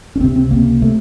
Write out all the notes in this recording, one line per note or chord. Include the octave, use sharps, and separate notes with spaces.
C#4
C#2 C3 C4
C4
C#2 C3 A#3
C3 A3